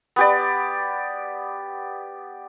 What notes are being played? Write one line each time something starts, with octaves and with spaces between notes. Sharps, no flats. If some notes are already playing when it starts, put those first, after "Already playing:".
B3 G4 D5